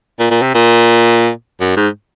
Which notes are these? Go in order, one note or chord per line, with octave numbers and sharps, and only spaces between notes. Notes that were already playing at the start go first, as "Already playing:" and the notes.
A#2
A#2
C3
A#2
F#2
G#2